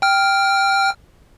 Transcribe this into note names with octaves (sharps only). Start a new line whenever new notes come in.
G5 F6